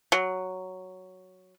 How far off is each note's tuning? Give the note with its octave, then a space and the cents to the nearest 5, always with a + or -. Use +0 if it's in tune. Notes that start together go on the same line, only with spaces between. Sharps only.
F#3 +0